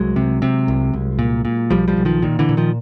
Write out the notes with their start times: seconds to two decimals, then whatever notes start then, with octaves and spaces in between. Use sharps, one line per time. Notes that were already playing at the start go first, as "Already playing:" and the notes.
Already playing: C2 F#3 G#3
0.16 C3
0.42 C3
0.68 C2
0.94 C2
1.19 A#2
1.45 A#2
1.70 B1 F3 G3
1.88 F3 G3
1.97 B1
2.05 D#3 F3
2.22 A#2 D#3
2.39 D3 E3
2.49 A#2
2.57 D#3 F3